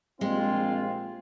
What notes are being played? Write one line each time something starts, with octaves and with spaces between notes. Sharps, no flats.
A#1 G3 G#3 C4 F4